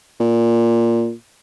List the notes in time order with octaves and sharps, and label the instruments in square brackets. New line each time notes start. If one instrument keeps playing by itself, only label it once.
[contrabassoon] A#2